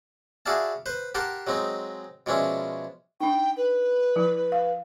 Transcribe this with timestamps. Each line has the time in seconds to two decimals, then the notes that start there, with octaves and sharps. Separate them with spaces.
0.46 E4 F#4 G#4 D5 F5 A5
0.86 B4 C5
1.15 G4 A#4 F#5 A5 C6
1.47 F#3 G#3 C4 D#4
2.26 B2 F3 G#3 C#4 D4 E4
3.21 D4 D#4 G5
3.57 B4
4.16 F3 E4
4.52 F5